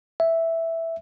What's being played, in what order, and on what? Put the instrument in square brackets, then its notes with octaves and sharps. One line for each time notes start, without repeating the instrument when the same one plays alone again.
[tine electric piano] E5